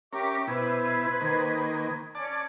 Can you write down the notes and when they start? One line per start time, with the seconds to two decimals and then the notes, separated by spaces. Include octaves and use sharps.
0.13 C#4 G4 A#4 E5 D6
0.47 B2 E4 B4 C5 G#6
1.21 D#3 A#3
2.15 C#4 D5 A5 G#6